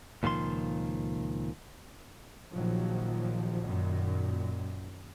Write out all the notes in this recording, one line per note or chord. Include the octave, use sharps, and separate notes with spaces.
C#2 A#2 D#3 F3 C6
A#1 D#3 F3 F#3
F#2 A#2 D#3